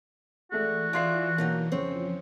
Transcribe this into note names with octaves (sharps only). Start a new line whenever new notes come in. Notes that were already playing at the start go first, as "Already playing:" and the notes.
E3 G#3 A3 F#4 D5
F4 G#4 D5 E5 C6 C7
B2 F#3 A#3 D#4
F2 C#3 F3 C4 C#5